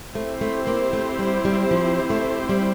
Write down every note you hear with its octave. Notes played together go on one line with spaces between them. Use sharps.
A3 C4 E4 G4 C5
A3
A#3
A3
G3
G3
F3
A3
G3